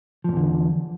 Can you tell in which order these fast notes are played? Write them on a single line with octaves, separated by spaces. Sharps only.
F3 G#2 E2 D3